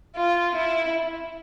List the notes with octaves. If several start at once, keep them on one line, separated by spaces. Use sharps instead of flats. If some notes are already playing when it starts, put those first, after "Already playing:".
F4
E4